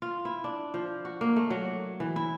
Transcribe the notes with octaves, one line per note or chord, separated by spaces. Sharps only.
F4
E4
D4
F3
F#4
A#3
A3
F#3
E3
E4